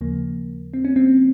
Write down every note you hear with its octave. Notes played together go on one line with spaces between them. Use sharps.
D#2 C#3 F3 A#3
C4
C#4
C4